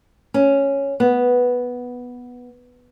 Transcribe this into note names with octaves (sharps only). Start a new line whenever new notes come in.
C#4
B3